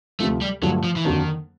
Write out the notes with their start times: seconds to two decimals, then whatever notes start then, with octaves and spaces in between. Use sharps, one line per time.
0.20 D2 C3 F3 A3
0.41 G3
0.62 G2 D3 F3 F#3 A3
0.84 F3
0.96 E3
1.05 F2 D3 D#3 F#3 A#3 D4